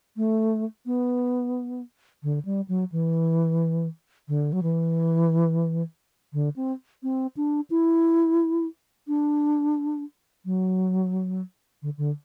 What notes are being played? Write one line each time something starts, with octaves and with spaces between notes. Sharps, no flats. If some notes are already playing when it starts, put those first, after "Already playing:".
A3
B3
D3
G3
F#3
E3
D3
F#3
E3
D3
C4
C4
D4
E4
D4
F#3
D3
D3